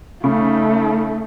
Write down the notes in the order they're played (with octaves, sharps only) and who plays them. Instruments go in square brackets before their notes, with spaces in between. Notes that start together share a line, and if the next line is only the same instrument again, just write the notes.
[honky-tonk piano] C#3 [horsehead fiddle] A3 D#4